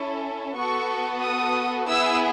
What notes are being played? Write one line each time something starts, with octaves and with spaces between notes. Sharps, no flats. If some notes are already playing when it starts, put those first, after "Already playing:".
Already playing: C#4 E4 A4
B3 F#4 A4 C#6
D#6
B3 E4 G#4 E6